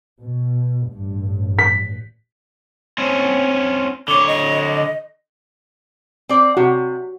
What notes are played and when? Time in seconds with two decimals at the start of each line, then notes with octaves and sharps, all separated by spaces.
0.22 B2
0.90 A1 G2
1.59 B6
2.98 C4 C#4
4.08 D3 C#5 D6
4.27 D#5
6.29 C4 D5
6.57 C3 F#4